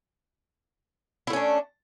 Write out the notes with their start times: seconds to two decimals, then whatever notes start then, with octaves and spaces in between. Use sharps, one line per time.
1.27 E4
1.30 A3
1.33 C#4
1.36 D4